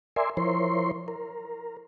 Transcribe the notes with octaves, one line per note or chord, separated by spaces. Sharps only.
A#4 D5 E5 G#5 C6
F3 E4 A#4 C5 C#5 C6
A#4